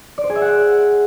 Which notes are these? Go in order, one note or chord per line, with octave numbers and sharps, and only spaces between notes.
D5
C5
G#4
E5
F#5